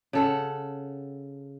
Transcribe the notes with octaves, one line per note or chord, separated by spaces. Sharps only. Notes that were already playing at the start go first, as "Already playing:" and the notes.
C#3 A4 F#5